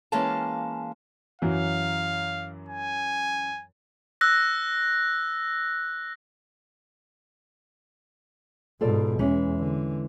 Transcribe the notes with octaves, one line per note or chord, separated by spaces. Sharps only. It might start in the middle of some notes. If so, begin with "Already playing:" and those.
E3 G#3 A#3 C#4 F5 A5
F#2 E3 F#3 F5
G#5
E6 F#6 A#6
G#2 B2 F4 A4 D5
E2 E3 G#3 C#4
D3